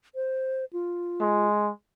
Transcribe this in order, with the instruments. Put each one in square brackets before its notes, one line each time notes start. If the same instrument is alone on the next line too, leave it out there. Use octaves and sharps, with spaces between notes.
[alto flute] C5
F4
[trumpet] G#3